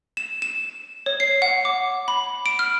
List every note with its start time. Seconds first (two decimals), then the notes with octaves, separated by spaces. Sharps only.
0.17 E7
0.42 E7
1.06 C#5
1.20 C7
1.42 F#5
1.65 D6
2.08 B5
2.46 D7
2.59 F6